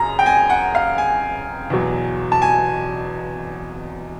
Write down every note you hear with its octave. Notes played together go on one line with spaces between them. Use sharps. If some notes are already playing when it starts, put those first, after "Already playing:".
Already playing: F#2 C#3 A#5
G5
G#5
F#5
F5
G#5
E2 B2 F#3
A5
G#5